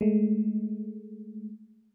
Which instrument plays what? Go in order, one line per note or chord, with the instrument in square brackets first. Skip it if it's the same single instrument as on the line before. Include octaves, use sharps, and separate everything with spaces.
[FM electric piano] G#3 A3